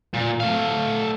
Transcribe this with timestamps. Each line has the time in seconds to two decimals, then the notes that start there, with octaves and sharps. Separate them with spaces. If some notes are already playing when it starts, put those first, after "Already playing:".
0.13 A#2
0.40 A3 F5